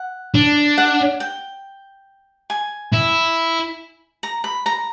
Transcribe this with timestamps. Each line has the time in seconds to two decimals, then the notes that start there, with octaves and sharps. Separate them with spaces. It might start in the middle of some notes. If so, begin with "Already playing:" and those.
Already playing: F#5
0.34 D4
0.78 F#5
1.20 G5
2.50 G#5
2.93 E4
4.23 A#5
4.44 B5
4.66 A#5